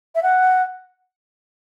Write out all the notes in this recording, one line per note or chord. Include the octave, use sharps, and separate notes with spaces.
E5
F#5